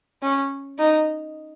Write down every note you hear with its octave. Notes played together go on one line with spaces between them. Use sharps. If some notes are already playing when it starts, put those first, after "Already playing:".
C#4
D#4